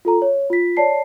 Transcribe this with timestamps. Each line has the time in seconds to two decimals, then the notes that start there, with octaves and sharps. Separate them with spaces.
0.05 F4 A4 A#5
0.22 C#5
0.50 F4 B6
0.77 C#5 D5 A5 C7